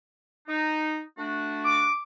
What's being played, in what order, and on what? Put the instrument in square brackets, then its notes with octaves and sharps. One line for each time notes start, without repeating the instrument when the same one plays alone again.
[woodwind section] D#4
A3 D4 F#4
[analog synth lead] D6